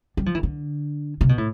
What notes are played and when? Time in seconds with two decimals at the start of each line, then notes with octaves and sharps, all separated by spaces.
0.17 G3
0.26 F3
0.35 E3
0.43 D3
1.21 C3
1.29 B2
1.38 A2